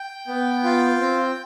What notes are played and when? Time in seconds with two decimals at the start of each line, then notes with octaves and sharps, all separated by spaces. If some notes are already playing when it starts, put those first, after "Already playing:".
Already playing: G5
0.28 B3
0.64 F4
1.00 C4